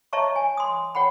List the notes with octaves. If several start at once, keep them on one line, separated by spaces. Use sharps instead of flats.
C#5 D#5 E5 A5 A#5 C#6
G#5
C6 D#6
C#5 F#5 G5 B5